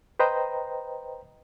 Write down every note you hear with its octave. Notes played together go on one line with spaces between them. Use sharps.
B4 C5 D#5 G5 A#5